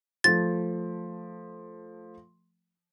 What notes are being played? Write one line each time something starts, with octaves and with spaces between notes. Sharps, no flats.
F3 A3 A6